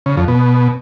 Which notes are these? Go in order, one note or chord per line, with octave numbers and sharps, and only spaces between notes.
C#3
F2
B2